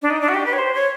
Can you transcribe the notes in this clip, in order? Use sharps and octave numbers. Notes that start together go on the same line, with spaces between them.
D4
D#4
D4
F#4
G4
B4
C#5
C5
C#5